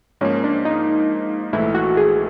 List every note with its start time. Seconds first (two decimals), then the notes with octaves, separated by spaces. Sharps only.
0.21 G#2 F3 A#3 C#4
0.44 D4
0.65 D#4
1.53 A#1 G#2 E3 A3 E4
1.75 F#4
1.97 G#4